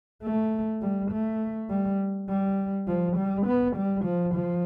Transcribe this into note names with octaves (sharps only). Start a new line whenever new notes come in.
A3
G3
A3
G3
G3
F3
G3
B3
G3
F3
F3